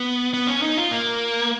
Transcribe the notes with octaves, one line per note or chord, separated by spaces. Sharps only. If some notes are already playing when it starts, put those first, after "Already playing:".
Already playing: B3
B3
C#4
D#4
F4
A#3